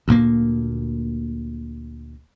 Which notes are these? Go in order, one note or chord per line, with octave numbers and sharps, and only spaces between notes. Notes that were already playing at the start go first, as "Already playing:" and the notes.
D2 A#2 A#3